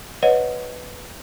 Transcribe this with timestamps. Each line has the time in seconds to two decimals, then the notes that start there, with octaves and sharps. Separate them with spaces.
0.23 B4 C#5 D#5 F#5